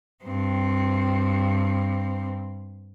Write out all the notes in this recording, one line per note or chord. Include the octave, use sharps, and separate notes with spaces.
G2 C4